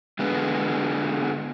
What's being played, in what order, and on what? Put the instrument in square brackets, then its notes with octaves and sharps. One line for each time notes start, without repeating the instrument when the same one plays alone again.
[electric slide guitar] D3 G#3 B3